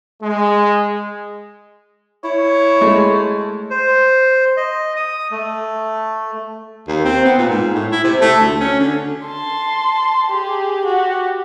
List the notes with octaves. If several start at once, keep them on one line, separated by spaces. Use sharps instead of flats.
G#3
E4 C#5
G#3 A3
C5
D#5
D#6
A3
D#2
C4
B3
A#2
G#2
A2
E4
C3
A3
D2
C#4
D3
A5 C6
G4 G#4
F#4 G4